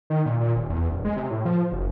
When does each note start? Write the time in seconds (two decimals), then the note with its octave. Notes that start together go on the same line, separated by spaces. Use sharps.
0.10 D#3
0.26 A#2
0.41 A#2
0.56 D#1
0.69 E2
0.90 D#1
1.05 G#3
1.17 C3
1.31 A2
1.45 F3
1.72 F#1